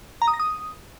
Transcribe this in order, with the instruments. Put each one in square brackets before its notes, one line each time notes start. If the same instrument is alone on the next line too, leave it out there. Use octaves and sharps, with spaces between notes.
[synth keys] A#5
D#6
A#6
D#6